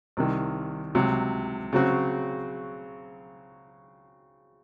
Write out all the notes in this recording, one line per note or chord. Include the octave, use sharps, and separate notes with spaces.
C2 C3 D#3
C#2 C3 F#3
C#3 F#3 C4 F#4